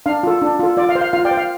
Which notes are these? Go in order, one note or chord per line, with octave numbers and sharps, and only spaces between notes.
D4 F5
F4 A4
D4
F4 A4
F4 D5
F5
C5
F5
F4 F5
D5 G5
C5
F5